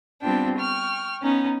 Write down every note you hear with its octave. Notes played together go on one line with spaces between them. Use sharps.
G3 B3 C4 D4 F4 G5
G5 C#6 F6
B3 C#4 D#4